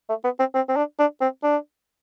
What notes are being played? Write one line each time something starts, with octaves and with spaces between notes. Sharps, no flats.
A3
B3
C4
C4
C4
D4
D4
C4
D4